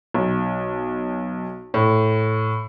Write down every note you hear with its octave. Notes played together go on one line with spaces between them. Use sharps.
B1
A2